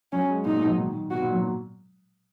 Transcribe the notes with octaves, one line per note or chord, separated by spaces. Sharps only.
F#3 C#4
G#3
A#2 D#4
B2
F#3
D#3
B2 F#4
A#2
F#3